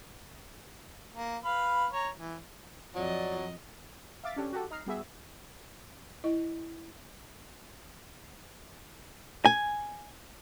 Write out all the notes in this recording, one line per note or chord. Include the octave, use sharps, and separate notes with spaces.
A#3
B4 F5 B5
C#5 A#5
E3
F2 F#3 D5 D#5
E5 F5 D6 A6 B6
C#4 D4 G4 A4
F#4 G4 A4
D#4 A#5 F6 C7
G3 B3 F#4 G#4 E5
E4 D#5
G#5